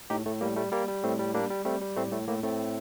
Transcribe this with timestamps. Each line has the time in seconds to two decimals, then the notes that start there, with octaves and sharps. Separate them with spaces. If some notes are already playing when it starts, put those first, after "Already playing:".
0.10 A2 D#4 G4
0.25 A2 A3
0.41 G3 A#3
0.56 G3 A3
0.72 G3 A#3
0.88 G3
1.03 A2 A3 C4
1.19 G3
1.34 G3 A#3 D4
1.50 G3
1.65 G3 A3 C4
1.81 G3
1.96 A2 A3 C4
2.12 A2 A3
2.28 A2 A#3
2.43 A2 A3 C4